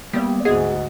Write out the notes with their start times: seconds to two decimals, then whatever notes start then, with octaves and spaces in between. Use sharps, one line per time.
0.13 G3 A#3 B3 D5
0.45 D2 G#2 F#4 G#4 D#5 F#5